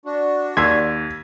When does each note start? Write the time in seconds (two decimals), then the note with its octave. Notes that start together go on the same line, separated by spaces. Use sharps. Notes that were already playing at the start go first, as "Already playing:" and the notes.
0.05 D4 F#4
0.57 D#2 C6 E6 G#6 B6